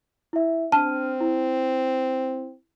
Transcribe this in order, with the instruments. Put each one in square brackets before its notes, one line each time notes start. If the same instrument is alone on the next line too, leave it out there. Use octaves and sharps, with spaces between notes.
[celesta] E4 E5
[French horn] C4 [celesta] D4 F6 D#7 [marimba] A5
[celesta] E4